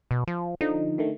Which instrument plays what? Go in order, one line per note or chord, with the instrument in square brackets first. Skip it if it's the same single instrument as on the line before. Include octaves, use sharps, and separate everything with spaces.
[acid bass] B2
F3
[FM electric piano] D3 F3 [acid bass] D#4
[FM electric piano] D3 D#3 A3